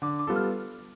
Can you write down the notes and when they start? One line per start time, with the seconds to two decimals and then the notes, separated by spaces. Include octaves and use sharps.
0.02 D3 D6
0.19 D6
0.27 G3 B3 F4 A4
0.36 F6